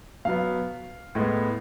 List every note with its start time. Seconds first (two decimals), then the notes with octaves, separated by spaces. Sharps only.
0.25 B2 F#3 B3 F5
1.15 A2 G#3 B3